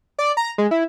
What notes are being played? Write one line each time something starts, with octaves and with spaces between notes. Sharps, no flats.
D5
A#5
G#3
E4